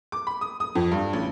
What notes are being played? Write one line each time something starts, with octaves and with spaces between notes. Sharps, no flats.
D6
B5
D#6
D#6
F2
G2
A1